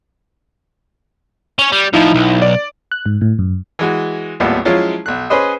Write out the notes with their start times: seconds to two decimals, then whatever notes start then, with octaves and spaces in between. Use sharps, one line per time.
1.59 C#4 C#5
1.72 G3
1.94 A2 F3 D#4 E4
2.15 B1
2.42 D5
2.92 F#6
3.06 G#2
3.21 A2
3.39 F#2
3.79 E3 G#3 F#4
4.40 G#1 D#2 A2 G3 B3 F4
4.65 F3 F#3 G#3 C#4 E4 F4
5.06 B1 F#6
5.30 C#4 G#4 B4 C5 D#5